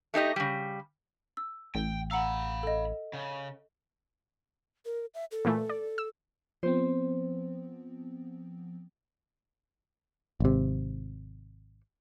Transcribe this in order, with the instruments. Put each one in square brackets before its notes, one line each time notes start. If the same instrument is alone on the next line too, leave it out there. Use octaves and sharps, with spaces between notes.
[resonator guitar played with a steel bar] A3 D#4 G4 D#5
C#3 G3
[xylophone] E6
[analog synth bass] A1 [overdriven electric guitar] G5
[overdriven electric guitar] F5 B5 [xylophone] F#5 A#5 E6
[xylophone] A4 D#5
[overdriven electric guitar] C#3
[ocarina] A#4
E5
A4
[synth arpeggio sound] A#2 E3 A3
D5
E6
[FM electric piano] F3 B3 C4 [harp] C5
[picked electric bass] G#1 C3